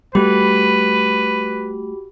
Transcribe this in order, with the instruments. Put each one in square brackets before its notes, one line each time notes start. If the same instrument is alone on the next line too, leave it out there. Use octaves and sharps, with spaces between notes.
[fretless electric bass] G3 A3 [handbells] F#4 G4 B5 [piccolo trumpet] B4